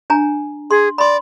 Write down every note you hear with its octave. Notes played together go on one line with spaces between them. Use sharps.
D4 G#5 A#5
G#4 C6
D5 B5 C6